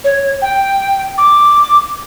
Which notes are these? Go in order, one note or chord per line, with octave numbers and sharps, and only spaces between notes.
C#5
G5
D6